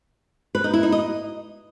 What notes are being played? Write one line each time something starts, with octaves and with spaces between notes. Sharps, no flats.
B4
D#4
E4
D#4
D#5